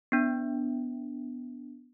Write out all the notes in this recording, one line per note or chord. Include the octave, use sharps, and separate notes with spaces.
B3 D4